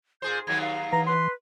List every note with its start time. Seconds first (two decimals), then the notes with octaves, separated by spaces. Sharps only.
0.22 A#2 G#4 C5 G6
0.47 D#2 D#3 F#3 G#6
0.61 F5
0.93 E3 A#5
1.07 B4 C6